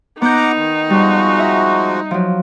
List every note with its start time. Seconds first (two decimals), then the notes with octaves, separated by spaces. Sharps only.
0.22 B3 D#4 F#5 A#5 D6 G6
0.56 D#3
0.90 F3 G3 G#3 F#4
1.39 E5 A#5
2.11 F3 F#3